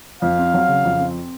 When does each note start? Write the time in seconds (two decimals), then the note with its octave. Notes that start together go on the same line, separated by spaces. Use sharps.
0.22 F2 F5
0.39 C4
0.54 F#3
0.68 C#3
0.84 F2
1.00 C4